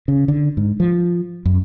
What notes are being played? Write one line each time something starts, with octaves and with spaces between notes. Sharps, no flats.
C#3
D3
G#2
F3
F#2